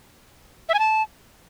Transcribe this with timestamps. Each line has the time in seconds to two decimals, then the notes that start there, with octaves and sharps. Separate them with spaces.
0.69 E5
0.74 G#5
0.79 A5